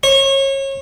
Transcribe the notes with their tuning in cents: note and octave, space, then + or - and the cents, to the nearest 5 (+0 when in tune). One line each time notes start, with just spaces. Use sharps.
C#5 -30